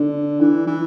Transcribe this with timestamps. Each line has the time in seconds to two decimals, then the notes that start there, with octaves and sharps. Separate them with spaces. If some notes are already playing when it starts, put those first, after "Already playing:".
Already playing: D3
0.40 E3
0.67 E3